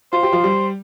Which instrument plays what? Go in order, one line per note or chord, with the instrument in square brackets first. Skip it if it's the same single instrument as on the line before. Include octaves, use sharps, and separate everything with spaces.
[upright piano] F4 [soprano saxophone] C5
[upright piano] G4
F3 F4
G3 G4